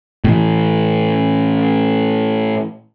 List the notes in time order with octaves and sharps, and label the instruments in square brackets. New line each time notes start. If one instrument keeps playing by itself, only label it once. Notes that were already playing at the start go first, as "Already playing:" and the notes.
[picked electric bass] A2 E3